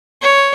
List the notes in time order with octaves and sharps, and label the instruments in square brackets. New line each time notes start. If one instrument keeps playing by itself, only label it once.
[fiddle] C#5